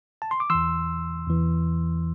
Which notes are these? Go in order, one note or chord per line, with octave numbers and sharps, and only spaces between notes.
A5
C6
D6
E2 E3 C6 E6
E2 E3